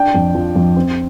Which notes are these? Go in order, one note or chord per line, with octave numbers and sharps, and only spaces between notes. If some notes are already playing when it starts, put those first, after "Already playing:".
Already playing: D4 G5
F2
F3
F2
C4